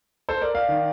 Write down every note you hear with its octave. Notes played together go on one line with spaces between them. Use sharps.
A4 C5
A#4 D5
D5 F5
D#3